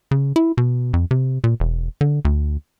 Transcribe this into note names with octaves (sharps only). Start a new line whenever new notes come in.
C#3
E4
B2
F2
C3
A#2
E1
D3
D2